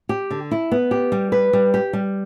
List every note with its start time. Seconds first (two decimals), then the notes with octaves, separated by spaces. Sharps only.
0.09 G4
0.31 D3
0.51 E4
0.72 B3
0.91 G4
1.12 G3
1.32 B4
1.53 G3
1.74 G4
1.93 G3